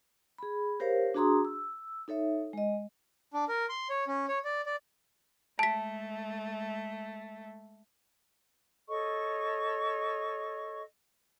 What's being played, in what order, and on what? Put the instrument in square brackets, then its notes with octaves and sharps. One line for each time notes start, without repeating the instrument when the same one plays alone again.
[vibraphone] G#4 B5
G4 A#4 C5 C#5 F5
D4 F#4 G#4 A#5 C6 D#6
E6
D#4 A4 C#5 E5
G#3 D#5
[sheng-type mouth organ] D4
A#4
C6
C#5
C#4
C#5
D5
D5
[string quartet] G#3 A3 [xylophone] A5 B6
[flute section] A4 C#5 D#5 C#6